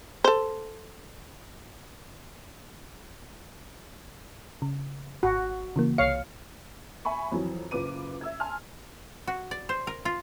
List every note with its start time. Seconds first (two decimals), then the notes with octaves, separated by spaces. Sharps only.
0.24 A4 C5
4.62 C#3
5.23 G#1 F#4
5.76 C#3 E3 A#3
5.98 C2 C#5 F5 C#7
7.05 E5 G#5 B5 C#6
7.32 F2 E3 F#3
7.71 F#1 F4 B4 D6 D#7
8.21 E5 E6 G#6
8.40 G#5 A5 C6 F6
9.27 F#4
9.51 D5
9.69 C5
9.87 A#4
10.05 F4